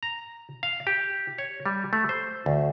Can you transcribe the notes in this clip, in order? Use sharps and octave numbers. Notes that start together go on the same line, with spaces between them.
A#5
F5
G4
C#5
G3
A3
C5
D2